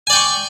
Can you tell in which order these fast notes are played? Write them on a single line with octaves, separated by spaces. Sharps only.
G#5 D5 G5 C#6